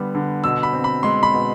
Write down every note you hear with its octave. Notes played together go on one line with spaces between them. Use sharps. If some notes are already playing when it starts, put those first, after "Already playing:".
Already playing: D3 G3 B3
D3
B2 E6
B5
C4
B5
G#3 C6
B5
B2